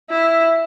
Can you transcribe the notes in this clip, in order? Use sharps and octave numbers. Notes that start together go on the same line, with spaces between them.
E4